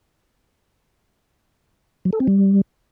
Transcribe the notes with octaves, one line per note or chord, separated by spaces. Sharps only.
F#3
A4
C4
G3